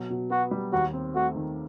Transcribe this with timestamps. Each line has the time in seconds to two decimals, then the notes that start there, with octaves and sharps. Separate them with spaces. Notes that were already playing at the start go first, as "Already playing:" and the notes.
Already playing: B2 F#3
0.10 B2
0.30 B3 F#4
0.51 G3
0.73 D#2 F#4
0.93 C4
1.15 A3 F#4
1.36 D#3